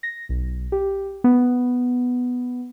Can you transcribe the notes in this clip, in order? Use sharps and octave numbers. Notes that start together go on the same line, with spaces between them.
A#6
B1
G4
B3